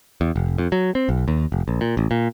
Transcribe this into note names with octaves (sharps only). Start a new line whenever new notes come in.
E2
F1
F2
F#3
C4
B1
D#2
F1
A#1
A#2
A1
A#2